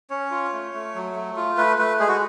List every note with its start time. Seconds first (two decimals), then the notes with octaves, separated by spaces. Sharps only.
0.10 C#4 C#5
0.31 F4
0.53 A3
0.74 A3
0.95 F#3
1.15 A3
1.37 F4
1.57 A3 B4
1.78 A3 B4
2.00 G#3 G#4
2.08 F#4